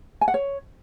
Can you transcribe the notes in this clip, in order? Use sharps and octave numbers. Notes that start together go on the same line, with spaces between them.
G#5
F#5
C#5